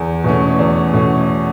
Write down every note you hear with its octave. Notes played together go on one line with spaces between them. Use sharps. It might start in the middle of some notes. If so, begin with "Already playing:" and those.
Already playing: E2
B2 A3 C#4
E2
B2 A3 C#4